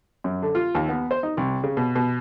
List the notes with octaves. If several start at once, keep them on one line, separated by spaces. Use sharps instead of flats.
F#2
D3
F4
D#2
B3
C5
D#4
C2
C#3
B2
B2